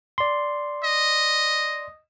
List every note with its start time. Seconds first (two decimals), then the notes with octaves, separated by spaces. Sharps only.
0.18 D5 C6
0.84 D#5